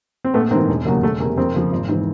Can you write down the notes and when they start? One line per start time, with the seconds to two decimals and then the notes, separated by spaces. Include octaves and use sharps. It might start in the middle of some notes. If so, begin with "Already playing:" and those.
0.24 C4
0.34 A#1 A3 B3
0.51 G#2 A#3 C4
0.55 E3
0.69 E1
0.85 D#2 C#3 F#3 A#3
1.02 E1 A3
1.20 E2 A#3
1.24 C3
1.38 F2 A#3 C4
1.55 C#3 F3
1.72 G#1
1.89 G#2 E3